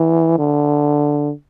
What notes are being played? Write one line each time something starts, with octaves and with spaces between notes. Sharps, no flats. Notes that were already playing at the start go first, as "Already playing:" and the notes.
Already playing: E3
D3